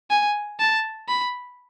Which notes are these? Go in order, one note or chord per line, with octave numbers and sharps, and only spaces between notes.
G#5
A5
B5